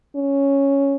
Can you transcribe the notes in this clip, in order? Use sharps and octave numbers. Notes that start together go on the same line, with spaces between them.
C#4